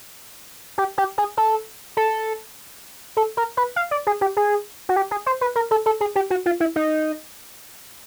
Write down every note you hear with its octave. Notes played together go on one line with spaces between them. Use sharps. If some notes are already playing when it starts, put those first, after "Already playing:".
G4
G4
G#4
A4
A4
A4
A#4
B4
F5
D5
G#4
G4
G#4
F#4
G4
G#4
C5
B4
A#4
A4
A4
G#4
G4
F#4
F4
E4
D#4